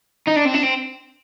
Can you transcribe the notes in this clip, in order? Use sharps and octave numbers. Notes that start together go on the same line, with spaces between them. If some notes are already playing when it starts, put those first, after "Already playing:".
D#4
D4
C4
D4
C4